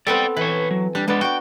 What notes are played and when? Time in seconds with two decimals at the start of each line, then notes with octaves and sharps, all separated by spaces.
0.07 B3 C4 A4 D5 G5
0.37 E3 B4 C#5
0.71 F#3
0.95 G3 D4
1.08 G#3 B3 D4 D5
1.21 F#4 D5 G5